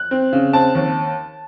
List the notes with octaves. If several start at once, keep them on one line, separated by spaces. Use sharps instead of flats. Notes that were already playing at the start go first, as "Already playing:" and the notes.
Already playing: F#6
C4
C#3
C4 A5
D#2